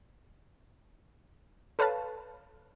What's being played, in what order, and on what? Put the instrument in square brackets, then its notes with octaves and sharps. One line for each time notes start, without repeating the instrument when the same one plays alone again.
[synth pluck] A4 B4 C#5 F5 A5